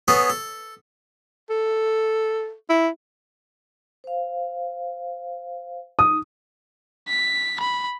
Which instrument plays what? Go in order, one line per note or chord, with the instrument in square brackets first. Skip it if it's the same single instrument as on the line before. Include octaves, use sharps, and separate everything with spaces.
[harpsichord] B3 G#4 A4 C#5
A4
[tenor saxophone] A4
E4
[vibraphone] C5 F5
[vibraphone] D#4 [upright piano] D#6
[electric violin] B6
B5